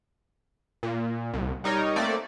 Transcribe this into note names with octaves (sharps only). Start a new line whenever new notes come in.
A#2
C2
G3 D#4 A#4 C#5
A3 A#3 C4 D5